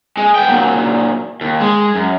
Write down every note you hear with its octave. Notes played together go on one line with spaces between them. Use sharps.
G#3
B3 G5
A#2 F#3
D#2
G#3
F#2